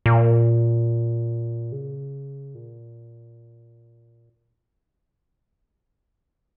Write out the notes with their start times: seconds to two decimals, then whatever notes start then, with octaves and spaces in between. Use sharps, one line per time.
0.06 A#2
1.72 C#3
2.55 A#2